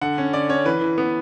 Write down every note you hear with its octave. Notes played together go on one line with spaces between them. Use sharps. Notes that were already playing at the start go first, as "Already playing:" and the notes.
D3 F#5
C#4
D3 D5
C#4 C#5
E3 B4
E3
B3